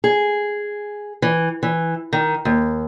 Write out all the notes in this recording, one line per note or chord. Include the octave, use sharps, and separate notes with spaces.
G#4
E3
E3
D#3
D#2